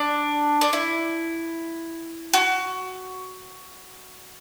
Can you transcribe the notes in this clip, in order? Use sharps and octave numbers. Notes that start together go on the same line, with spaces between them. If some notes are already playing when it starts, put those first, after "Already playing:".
Already playing: D4
D4
E4
F#4